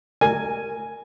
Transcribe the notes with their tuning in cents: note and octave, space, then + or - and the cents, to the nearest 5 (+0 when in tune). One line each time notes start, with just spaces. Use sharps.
A#4 -20 G#5 +0